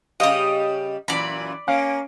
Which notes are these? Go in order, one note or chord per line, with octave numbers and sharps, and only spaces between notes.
C#3 G3 G4 D#5 F5 D#6
F#2 A#2 E3 D5 B5
A#3 C#4 F5